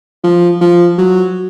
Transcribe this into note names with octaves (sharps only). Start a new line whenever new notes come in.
F3
F3
F#3